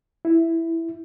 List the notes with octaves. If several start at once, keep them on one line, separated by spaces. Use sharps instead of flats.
E4